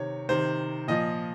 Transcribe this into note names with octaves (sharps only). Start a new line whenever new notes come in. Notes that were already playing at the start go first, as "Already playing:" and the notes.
Already playing: C3 D#3 C#5
C3 D#3 C5
A#2 F3 D#5